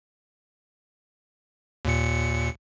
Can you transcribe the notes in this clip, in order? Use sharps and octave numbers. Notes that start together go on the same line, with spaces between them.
D#2 A#2 C#7